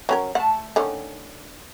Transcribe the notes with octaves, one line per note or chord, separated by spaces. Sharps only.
F#3 C#4 A#4
A3 F#5 A5
D3 D#3 C#4